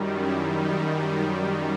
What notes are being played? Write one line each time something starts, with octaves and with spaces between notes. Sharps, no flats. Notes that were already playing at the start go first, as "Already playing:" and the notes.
Already playing: F#2 D#3 G3
E4
D#4